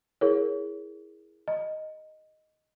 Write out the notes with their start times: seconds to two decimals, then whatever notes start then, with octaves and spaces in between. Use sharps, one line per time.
0.21 E4 G#4 A#4 C#5
1.48 D#5